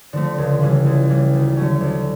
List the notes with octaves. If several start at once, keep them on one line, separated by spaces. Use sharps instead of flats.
D3 F3 A3 C4
C#2
C#3 E3 G3
C#2
C#3 E3 G3
D2
D3 F#3 A3 C#4
D2